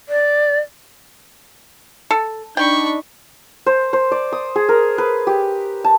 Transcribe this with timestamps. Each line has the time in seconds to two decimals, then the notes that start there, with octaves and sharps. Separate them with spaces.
0.08 D5
2.11 A4
2.57 D4 D#4 G5 B5 C#6
3.66 C5
3.93 C5
4.12 D5
4.32 D#6
4.56 G#4
4.69 A#4
4.98 B4
5.27 G4
5.84 A5